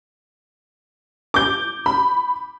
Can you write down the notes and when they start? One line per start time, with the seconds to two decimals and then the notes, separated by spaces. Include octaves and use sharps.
1.34 D6 G6
1.86 B5